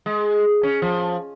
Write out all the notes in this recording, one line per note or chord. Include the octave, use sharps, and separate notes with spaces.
G#3
C#4
F3